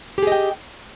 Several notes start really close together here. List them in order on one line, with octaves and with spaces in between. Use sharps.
G4 G#4 D#5 G5